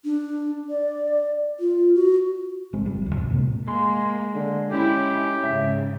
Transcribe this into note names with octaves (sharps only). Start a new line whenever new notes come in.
D4
D5
F4
F#4
G#1 G#3 C4
G1 G3
D2 G3
C2 F2 B2
A2 C3 G#3 A#3
G#3 A#3 C6
D3
C#4 E4 G4
G#2 C#3 E5